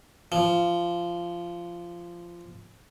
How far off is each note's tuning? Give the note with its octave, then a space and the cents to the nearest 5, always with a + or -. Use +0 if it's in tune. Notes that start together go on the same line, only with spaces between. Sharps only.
F3 -15